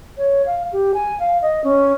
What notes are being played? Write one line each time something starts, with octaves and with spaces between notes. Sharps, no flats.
C#5
F5
G4
G#5
F5
D#5
C#4